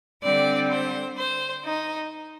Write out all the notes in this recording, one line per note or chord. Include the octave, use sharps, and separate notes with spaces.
D3 G3 C4 D5
C5
C5
D#4